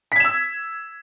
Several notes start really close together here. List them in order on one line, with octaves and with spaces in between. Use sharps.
B6 G#6 E7 E6